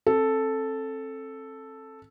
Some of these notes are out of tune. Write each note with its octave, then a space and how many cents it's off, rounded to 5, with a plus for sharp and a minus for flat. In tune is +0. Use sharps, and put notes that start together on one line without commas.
C4 +35 A4 +0